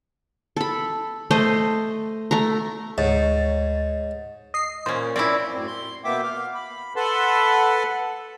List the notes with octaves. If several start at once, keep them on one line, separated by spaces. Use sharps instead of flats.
A4 B5
A3 C5 D#5
A3 A#5
D2 G#2 C#5 A6
D#5 C7
A#2 C#4 C5
C4 C#4 E4 D5
F#2 A2 C4
C6
B2 A#3 B3 E5 G5 D6
F5
B5
A4 B4 F#5 A5 B5 C6